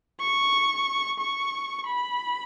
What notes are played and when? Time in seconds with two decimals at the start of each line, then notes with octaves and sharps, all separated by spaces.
0.20 C#6
1.19 C#6
1.86 B5